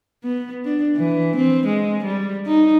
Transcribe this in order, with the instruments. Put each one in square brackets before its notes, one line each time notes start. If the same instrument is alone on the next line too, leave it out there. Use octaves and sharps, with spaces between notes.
[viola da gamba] B3
D4
E3
C4
G#3
G3
D#4